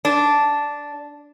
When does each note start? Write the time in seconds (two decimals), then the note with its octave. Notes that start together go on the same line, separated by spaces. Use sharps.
0.05 D4